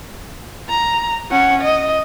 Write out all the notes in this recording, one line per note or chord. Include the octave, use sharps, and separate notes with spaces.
A#5
C#4 F#5
D#5